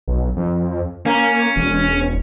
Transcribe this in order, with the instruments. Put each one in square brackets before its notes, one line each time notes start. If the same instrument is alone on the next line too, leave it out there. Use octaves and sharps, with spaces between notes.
[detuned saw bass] B1
F2
[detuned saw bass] A#3 [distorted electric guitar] C#4
[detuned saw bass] E1